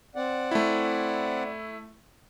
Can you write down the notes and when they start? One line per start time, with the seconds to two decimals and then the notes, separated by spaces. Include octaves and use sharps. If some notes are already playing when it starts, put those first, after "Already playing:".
0.15 C4 D5 F#5
0.51 A3 E4